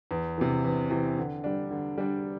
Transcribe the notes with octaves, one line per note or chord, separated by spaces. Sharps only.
E2
C3 E3
E2
C3 E3
D3
G3 D4
D3
G3 D4